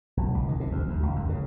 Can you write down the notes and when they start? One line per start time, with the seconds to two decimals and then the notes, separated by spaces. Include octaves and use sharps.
0.17 B1
0.34 C#2
0.49 D#3
0.60 C3
0.71 D2
0.88 D2
1.03 C#2
1.16 F#2
1.29 C#3